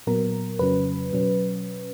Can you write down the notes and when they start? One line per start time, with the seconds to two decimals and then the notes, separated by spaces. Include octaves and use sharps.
0.07 A#2 F#3 B3 A#4
0.59 F2 C#3 F#3 C#4 B4
1.13 B2 F#3 C#4